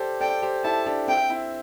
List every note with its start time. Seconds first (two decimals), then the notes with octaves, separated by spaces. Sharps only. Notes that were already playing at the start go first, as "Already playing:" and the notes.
Already playing: G4 A4 C5 D5
0.21 A4 D5 G5
0.42 G4 C5
0.64 E4 A4 A5
0.86 D4 G4
1.07 C4 E4 G5
1.29 C4 E4